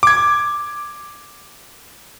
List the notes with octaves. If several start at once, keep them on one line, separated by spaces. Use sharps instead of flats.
D6 G#6